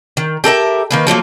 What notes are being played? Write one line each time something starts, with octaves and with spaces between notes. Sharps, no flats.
D#3
G4 A4 A#4 E5
D#3 A#3 B4
F3 F#3 A3 A#3